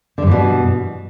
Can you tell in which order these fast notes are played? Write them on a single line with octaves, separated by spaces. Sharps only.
D3 G2 E3 B2